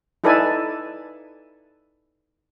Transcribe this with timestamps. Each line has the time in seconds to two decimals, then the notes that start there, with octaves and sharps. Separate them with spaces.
0.24 D#4 E4 A4 B4 D5 G#5